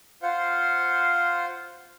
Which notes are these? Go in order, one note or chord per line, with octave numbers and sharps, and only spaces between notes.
F4 C5 F5 F#5